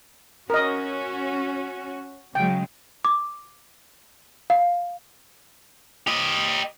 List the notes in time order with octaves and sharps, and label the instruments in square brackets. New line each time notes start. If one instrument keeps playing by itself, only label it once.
[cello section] C#4 F#4 [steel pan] A#4 D#5
[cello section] C#3 F#3 G#3 [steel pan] G5
[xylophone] D6
F5
[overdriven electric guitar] G4 D#5